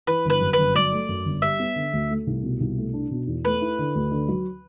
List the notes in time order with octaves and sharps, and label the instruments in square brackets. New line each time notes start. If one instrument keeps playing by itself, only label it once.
[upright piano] E3 [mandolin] B4
[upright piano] G1 [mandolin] B4
[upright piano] F#2
[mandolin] B4
[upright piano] G1
[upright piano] F#3 [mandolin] D5
[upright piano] A3
F#2
G1
[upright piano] G3 [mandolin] E5
[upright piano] B3
D3
D2
A3
C2
B2
C2
A3
D4
B2
E2
[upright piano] A3 [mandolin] B4
[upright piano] E4
D3
D2
D3
F#3